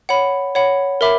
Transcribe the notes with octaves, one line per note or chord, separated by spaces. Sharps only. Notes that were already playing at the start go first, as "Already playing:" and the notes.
C#5 F#5 B5
C#5 F#5 B5
A#4 E5 B5 D6